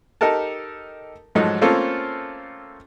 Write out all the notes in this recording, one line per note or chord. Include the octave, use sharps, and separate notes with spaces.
D#4 G4 A4 A#4 A5
G#2 F3 F#3 A3 D#4
A3 A#3 C4 C#4 F4 A4